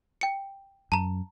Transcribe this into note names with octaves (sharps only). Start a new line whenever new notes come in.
G5 C#7
F#2 A5 A#5